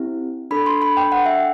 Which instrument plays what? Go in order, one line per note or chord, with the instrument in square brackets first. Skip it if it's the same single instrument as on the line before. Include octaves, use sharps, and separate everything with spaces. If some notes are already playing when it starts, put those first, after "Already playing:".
Already playing: [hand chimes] C4 E4 G4
D4 A4 B5
C6
B5
G5
F#5
E5